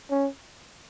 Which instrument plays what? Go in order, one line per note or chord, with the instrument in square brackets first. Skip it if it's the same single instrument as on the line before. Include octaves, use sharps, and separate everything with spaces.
[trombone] C#4